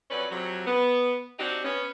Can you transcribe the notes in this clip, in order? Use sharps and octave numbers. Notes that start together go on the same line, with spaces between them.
F2 F#3 C#4 B4 D5
F2 C3 F#3
B3
C4 D4 D#4 F#4 G4
B3 C#4